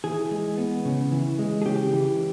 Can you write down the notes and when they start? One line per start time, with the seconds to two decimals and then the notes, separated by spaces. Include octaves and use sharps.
0.04 E3 G#4
0.31 G#3
0.58 B3
0.85 C#3
1.12 E3
1.39 G#3
1.62 G#4
1.65 C#3 G4
1.93 E3